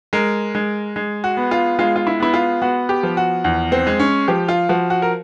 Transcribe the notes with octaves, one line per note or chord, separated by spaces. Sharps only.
G#3 A#4
G#3
G#3
F#4
B3
F4
G#3 F4
F4
E4
B3 E4
F4
B3 F#4
G4
F3
F#4
E2
C4
G#3
C#4
F3 G4
F4
F3 F#4
F#4
A#4